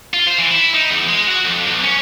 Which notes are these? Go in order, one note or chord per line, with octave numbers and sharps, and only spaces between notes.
F4
C5
E3
E4
D#4
E2
G#3
F#4
F2
B1
C#4